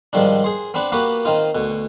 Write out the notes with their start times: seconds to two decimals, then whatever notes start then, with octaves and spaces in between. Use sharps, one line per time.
0.13 G#2 D#3 F3 G3 D4
0.44 G#4 C5
0.74 B3 C4 D4 B4
0.92 A#3 B3 F#4 G4 B4
1.25 D#3 C4 D#4 F4
1.55 D2 B2